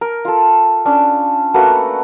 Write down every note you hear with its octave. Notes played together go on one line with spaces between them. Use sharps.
A#4
F4 A4
C#4 D4
A3 A#3 F#4 B4